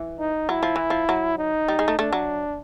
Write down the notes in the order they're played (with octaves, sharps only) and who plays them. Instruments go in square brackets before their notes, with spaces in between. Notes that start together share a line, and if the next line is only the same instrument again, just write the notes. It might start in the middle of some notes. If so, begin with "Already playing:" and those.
Already playing: [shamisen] E3
[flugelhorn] D#4
[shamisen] F#3 [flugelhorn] E4
[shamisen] F3
E3
F3
F#3
[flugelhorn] D#4
[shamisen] G3
G#3
A3
[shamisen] A3 [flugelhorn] D4
[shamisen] F#3